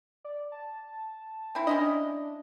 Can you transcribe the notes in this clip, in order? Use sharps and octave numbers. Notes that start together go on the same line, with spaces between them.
D5
A5
C4 E4
C#4 D4 E4 D#5